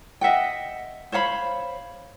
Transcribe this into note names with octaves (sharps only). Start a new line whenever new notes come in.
D#5 E5 F#5 G5
C5 C#5 F5 B5